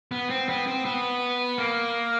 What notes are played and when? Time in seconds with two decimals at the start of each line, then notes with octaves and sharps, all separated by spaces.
0.12 B3
0.30 C4
0.49 B3
0.67 C4
0.85 B3
1.58 A#3